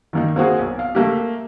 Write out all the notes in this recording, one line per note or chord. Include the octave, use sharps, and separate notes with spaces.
D#3 A#3 D#4
A#3 C4 F#4 G#4
B1
F5
A3 A#3 G4